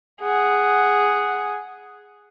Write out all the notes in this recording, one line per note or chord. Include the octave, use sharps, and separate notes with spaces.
G#4 F#5